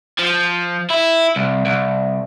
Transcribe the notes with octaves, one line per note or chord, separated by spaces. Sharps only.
F3
E4
C2
C2